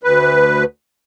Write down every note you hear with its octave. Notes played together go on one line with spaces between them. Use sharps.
D2 B4